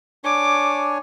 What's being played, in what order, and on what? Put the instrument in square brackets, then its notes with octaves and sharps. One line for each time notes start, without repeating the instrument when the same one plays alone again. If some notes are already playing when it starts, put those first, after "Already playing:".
[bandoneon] D4 C#5 G#5 [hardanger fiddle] D6